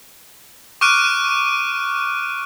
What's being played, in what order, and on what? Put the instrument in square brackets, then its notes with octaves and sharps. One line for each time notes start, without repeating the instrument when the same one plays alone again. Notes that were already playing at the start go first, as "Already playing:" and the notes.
[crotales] C#6 D6 F6 F#6 D7 D#7